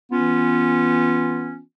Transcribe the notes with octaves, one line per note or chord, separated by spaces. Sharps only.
E3 B3 C#4 F4